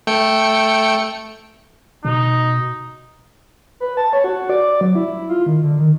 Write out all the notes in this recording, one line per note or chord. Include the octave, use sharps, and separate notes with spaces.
A3 G5 C#7
B2 D#4
B4
A5
C#5
F#4
D5
F#3
E4
F4
D#3
D3
D#3